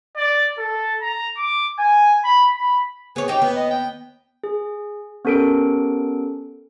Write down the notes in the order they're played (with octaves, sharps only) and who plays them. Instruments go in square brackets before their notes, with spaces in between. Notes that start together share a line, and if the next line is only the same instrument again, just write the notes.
[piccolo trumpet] D5
A4
A#5
D6
G#5
B5
B5
[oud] B3 C#5 [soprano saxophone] G#4
[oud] D#4 G4 [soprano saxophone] G5
[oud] D#2 B3
[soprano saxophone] D#5
G5
[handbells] G#4
B3 C#4 G4 A4 A#4 D7